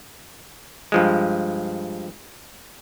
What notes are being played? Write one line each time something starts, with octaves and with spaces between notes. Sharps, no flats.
G2 F3 G#3